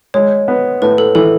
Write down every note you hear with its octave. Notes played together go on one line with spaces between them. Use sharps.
G#3 C#5
B3
A2 B4
A4
E3 A4